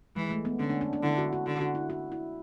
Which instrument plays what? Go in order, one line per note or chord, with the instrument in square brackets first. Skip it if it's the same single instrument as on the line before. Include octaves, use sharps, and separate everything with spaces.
[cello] E3 [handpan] G#3
[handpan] A3
B3
[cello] D3 [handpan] C#4
[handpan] D4
D4
D4
[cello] D3 [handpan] E4
[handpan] F#4
F#4
[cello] D3 [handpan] F#4
[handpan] F#4
E4
F#4
E4